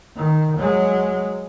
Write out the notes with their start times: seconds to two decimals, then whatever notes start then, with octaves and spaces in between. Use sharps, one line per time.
0.16 D#3
0.58 F#3 G#3